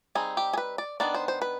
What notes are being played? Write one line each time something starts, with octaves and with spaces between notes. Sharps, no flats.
G3 C4 D#4 G#4
G4
G#4
B4
D5
D#3 B3 D4 D5
C5
C5
B4